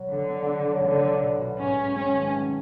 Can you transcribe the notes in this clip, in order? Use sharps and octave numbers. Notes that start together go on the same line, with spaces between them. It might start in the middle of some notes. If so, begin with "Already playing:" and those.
Already playing: B2 F#3
D3 B3
B3
B3
F#3
D3 A3
B1
B2
B2
G#2 C#4
G#2
G#3 C#4
G#1
A3